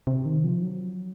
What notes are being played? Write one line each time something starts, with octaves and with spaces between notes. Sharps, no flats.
C3
D#3
F3
F#3